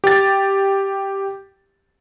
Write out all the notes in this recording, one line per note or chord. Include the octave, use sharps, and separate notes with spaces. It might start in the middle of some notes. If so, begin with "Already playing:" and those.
G4 A6